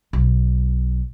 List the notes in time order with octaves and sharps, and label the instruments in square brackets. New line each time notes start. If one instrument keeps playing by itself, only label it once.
[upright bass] B1